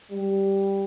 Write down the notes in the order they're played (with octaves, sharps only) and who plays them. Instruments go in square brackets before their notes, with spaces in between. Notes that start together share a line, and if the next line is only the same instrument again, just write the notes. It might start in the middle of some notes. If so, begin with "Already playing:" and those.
[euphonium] G3